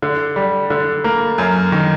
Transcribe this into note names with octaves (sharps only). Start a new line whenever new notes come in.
D3
G3
D3
A#3
F#2
D#3